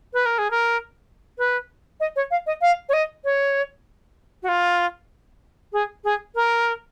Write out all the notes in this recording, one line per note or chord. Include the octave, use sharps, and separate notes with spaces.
B4
A#4
G#4
A#4
B4
D#5
C#5
F5
D#5
F5
C#5
D#5
C#5
F#4
F4
G#4
G#4
A#4